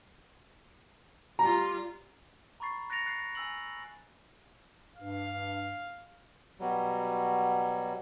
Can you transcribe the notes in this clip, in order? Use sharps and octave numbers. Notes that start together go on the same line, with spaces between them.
G3 F4 A#5
A#5 B5 C#6 A6 C7
F#6 A6 A#6 C#7 D7 F7
F#6 A6 C7
G#5 E6 F#7
G2 F5
B2 F#3 G3